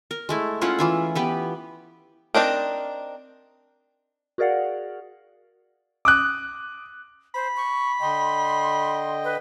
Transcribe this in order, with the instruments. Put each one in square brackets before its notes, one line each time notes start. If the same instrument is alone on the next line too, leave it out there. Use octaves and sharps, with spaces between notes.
[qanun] A#4
G#3 A3 E4
C#4 E4 F4 F#5
E3 F4 E5
B3 G4 B4
[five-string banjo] C4 D4 D#4 A#4
[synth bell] F#4 G#4 A#4 D5 F5 F#5
[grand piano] D6 D#6 F#6
[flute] C5 [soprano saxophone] B5
[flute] C#6
[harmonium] D3 D#5 G5 [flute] C6
[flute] B4